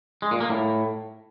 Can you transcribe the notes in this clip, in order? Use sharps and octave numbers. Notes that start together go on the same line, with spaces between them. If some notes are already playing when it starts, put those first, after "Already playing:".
G#3
A#2
A#3
A2